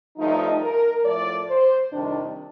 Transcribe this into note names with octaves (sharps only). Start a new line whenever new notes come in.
G2 D3 F3 A3 D#4
A#4
A2 F3 A3 D5
C5
F2 C3 D#3 G3 D4